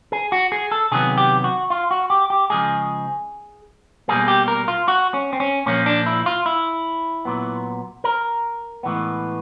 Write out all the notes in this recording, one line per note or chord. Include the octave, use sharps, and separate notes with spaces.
G#4
F#4
G#4
A4
C3 D#3 F#3 B3 G#4
G4
F#4
F4
F#4
G4
G4
C#3 F3 G#3 G#4
B2 G3 A#3 G#4
G4
A#4
F4
F#4
C#4
C4
C#4
A#2 F3 A#3 C#4
D4
E4
F4
E4
A#2 F#3 B3
A#4
A2 E3 G#3 B3